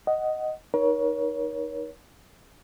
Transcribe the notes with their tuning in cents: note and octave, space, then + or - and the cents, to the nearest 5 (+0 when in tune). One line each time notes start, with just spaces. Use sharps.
D#5 +0 F#5 +10
D#4 +0 A#4 +40 C#5 +15